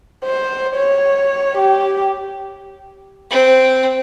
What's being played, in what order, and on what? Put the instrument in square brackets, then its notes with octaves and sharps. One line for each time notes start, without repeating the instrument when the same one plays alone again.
[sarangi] C5
C#5
G4
[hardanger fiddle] C4